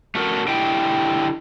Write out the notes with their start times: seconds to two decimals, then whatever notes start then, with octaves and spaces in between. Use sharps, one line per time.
0.15 A3 F#4 A#4
0.48 D3 E4 G4 D#5 E5 G5